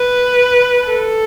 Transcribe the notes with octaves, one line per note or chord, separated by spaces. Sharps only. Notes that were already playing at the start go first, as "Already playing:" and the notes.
Already playing: B4
A4